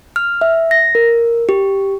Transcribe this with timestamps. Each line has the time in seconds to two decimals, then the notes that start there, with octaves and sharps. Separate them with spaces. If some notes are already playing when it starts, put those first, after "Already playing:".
0.16 F6
0.41 E5
0.71 A#6
0.95 A#4
1.49 G4